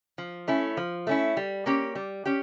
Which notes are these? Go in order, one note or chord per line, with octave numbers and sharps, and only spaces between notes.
F3
A3 C#4 E4
F3
A3 C#4 E4
G3
A#3 C#4 G4
G3
C#4 G4